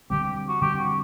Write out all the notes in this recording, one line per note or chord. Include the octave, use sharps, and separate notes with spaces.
D3 G3 C4 G4
G4
F#4
D3 G3 C4 G4
F#4